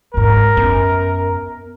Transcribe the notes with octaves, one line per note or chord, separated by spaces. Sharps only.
G1 G#2 A#4
F#2 B3